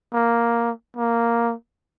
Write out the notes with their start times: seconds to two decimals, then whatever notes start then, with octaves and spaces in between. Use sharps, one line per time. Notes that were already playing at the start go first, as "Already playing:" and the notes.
0.13 A#3
0.96 A#3